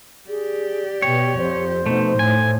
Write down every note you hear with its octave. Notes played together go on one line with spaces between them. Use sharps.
G4 G#4 D5
B2 C#5 G5
F2 C5
B2 A3 D#4
A2 G#5